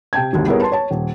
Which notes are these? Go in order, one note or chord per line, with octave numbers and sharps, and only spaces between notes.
C3 G5 A5 G#6
G#1 D#2 D3 F#3
G3 B3 E4 G#4 A#4 C#5
B4 A5 C6
C#5 A5
D#1